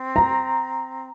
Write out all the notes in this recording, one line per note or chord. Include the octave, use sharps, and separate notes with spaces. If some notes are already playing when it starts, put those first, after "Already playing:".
Already playing: C4
A#5